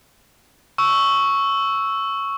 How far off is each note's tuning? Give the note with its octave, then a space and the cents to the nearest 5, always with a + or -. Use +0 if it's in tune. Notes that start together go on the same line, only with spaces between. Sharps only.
C#6 +0 E6 +0